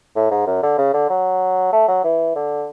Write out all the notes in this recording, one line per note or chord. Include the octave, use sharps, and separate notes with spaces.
A2
G#2
F#2
D3
C#3
D3
F#3
A3
F#3
E3
D3